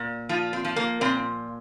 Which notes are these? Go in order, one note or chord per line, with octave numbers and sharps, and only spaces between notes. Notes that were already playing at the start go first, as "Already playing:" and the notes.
Already playing: A#2
F3 F4
C4
F3
A#3
A#2 C4